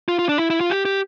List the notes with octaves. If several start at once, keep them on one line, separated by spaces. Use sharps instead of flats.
F4
F4
D4
E4
E4
F4
G4
G4